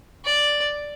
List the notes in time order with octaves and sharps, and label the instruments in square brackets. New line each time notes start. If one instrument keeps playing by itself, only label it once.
[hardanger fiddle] D5